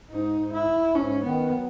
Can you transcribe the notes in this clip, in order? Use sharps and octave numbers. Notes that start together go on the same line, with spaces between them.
G#2 D#4
G#2
E4
G#2 C#4
D#3 B3
F#3